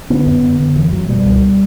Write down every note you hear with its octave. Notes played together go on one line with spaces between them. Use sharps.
D3 B3
F#2
D3
D3
F#2 E3
F#2 F#3
B2 G3
C#2